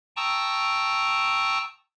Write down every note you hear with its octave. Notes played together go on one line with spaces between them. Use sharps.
G5 A5 A#5 C#6 D#6 E6